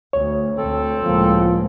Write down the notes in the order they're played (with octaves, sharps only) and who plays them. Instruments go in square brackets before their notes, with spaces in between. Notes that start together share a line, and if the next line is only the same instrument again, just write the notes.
[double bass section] D2 [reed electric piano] C#5
[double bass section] D2 [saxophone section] C4 A4
[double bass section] C#2 A2 A#3 [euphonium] F3